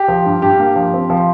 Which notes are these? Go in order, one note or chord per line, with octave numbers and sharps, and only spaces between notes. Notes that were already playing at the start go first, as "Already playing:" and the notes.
Already playing: G4
F3
G2
G2 G4
A#3
F3
C4
F3